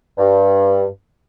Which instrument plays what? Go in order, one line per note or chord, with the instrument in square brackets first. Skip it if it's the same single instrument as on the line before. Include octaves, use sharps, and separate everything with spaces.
[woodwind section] G2